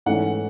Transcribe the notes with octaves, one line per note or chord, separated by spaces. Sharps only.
G#2 E3 A3 C#4 F#5